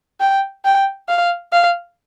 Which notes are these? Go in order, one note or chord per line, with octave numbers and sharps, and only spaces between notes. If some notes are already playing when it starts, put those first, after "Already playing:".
G5
G5
F5
F5